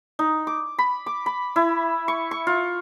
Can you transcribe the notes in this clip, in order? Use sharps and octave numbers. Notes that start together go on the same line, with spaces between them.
D#4
D6
B5
D6
B5
E4
C#6
C#6
F4